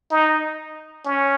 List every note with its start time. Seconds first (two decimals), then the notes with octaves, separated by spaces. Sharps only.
0.11 D#4
1.05 C#4